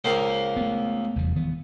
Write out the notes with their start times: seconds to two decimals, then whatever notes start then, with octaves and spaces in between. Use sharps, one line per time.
0.04 C#2 A#3 C5
0.56 A3 B3
1.16 F1 E2 G3
1.36 D#3 E3 B3